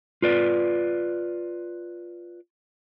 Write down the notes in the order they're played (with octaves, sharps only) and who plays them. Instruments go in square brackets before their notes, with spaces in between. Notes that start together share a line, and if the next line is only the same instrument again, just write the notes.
[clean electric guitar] F4 B4 D5